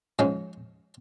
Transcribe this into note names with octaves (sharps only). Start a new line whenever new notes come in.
G#2 F3 G#3 C#4